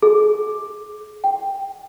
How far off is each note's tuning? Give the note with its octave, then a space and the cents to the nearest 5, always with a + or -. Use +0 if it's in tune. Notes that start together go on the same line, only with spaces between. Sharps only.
G#4 +30
G5 +5